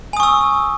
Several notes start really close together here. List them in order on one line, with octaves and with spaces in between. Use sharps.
G#5 D#6 C#6 E6